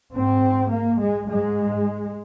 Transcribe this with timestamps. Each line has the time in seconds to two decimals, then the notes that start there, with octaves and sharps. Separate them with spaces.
0.15 G#2 C4
0.72 A#3
1.01 G#3
1.30 G#2 G#3